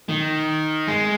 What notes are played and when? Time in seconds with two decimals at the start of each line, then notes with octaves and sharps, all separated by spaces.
0.09 D#3
0.88 G#3